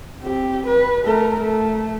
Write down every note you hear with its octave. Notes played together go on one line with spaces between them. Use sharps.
C4 G4
B4
A3 A#4
A3